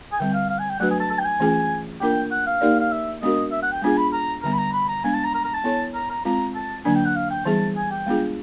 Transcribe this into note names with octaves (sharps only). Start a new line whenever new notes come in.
G#5
D3 G3 C4 G5
F5
F5
G#5
G5
F#3 A3 D4 F#4 B4 F#5
G#5
A5
A5
G5
G#5
E3 A3 C#4 F4 G#4
A#3 D4 F4 A#4 G5
F#5
F5
A#3 D#4 G4 A#4 D5
F5
E5
G#3 B3 D4 F#4 A#4 D#5
E5
F#5
G5
G#3 B3 D4 F4 G#4 G#5
B5
A#5
D3 G3 B3 A#5
B5
A#5
B5
A#5
G#3 B3 D4 G#5
A5
A#5
A#5
A#5
A5
B3 E4 A4 C#5
A#5
A#5
G#3 C4 F4 A#5
A5
D3 F#3 A#3 D4 G#5
G5
F#5
F5
G5
E3 G3 B3 E4 G#4 A5
G#5
G5
G#3 B3 D4 F4 G#4